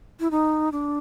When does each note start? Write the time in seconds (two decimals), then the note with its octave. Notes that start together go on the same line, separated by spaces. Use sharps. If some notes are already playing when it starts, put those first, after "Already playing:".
0.20 E4
0.31 D#4
0.72 D4